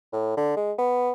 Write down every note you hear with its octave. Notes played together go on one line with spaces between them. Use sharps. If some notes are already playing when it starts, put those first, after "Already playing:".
A2
D3
G#3
B3